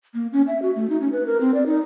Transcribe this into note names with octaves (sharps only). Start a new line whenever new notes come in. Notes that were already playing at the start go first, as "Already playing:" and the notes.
A#3
C#4
E5
F#4
A3
D#4
C#4
B4
A#4
C4
D5
D#4